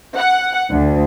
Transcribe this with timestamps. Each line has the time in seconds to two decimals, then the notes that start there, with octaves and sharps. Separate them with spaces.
0.17 F#5
0.70 D2